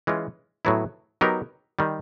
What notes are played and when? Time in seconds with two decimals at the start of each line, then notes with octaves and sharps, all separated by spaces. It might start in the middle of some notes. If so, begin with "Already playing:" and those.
0.07 E3 G#3 C#4 F4
0.65 A2 F#3 B3 E4
1.21 F#3 B3 D#4 G4 A#4
1.79 D#3 G3